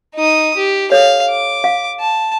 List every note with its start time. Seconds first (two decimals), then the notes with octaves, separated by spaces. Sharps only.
0.15 D#4 D#6
0.57 G4
0.92 A4 C#5 F5
1.28 D6
1.64 F5
2.00 A5